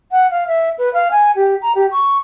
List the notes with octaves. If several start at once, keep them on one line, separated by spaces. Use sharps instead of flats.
F#5
F5
E5
B4
F5
G#5
G4
A#5
G4
C#6